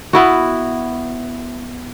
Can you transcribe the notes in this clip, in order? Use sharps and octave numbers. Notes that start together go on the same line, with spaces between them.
B3 E4 F#4